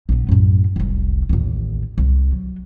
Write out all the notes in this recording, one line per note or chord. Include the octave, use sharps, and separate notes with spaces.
A#1 B3
F#2 A2
F1 C2
A1 D#2
C2
F#3